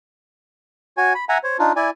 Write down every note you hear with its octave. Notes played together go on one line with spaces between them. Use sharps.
F#4 C#5 G#5
B5
E5 F#5 G#5 A#5
C5 C#5
D4 D#4 F4
E4 D5 G#5